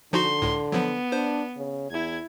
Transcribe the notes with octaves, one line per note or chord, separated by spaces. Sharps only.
D3 F3 D#4 F#4 C6
C#2 A2
F3 F#3 B3
D4 C5
C#3
E2 E4 G#6